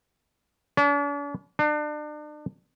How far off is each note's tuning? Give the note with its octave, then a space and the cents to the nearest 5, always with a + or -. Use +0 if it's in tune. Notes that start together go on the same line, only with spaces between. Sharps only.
D4 -45
D4 +35